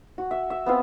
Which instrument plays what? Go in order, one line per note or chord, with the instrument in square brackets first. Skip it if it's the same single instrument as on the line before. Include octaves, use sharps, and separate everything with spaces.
[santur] F#4
E5
E5
B3 C4 F4